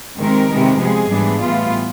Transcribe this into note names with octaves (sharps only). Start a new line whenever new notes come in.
C3 D#3 G#3 C4 A#4
C3 D#3 G#3 B3
C3 F3 G#3 G#4
G#2 E3 G3 B3 D4
A2 E3 G3 B3 F4